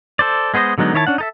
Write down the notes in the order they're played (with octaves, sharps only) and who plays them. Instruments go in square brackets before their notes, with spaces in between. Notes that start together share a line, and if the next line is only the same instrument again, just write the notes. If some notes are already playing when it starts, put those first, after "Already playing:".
[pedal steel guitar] A4 C5 D5
G#3 B3 G#4 C5 D#5
D3 F#3 G#3 B3 D#4
D#3 E4 C#5 D#5 A5
C#4 D4 F#5
D#4 A4 E5